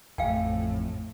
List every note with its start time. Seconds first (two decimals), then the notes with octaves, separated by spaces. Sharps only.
0.18 A1 F2 A2 F5 G5 G#5